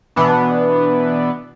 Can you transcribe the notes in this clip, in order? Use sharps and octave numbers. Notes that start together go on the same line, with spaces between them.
B2 E3 B3 D4